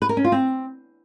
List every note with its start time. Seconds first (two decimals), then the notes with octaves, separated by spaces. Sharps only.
0.02 B4
0.09 A#4
0.17 C#4
0.24 F4
0.32 C4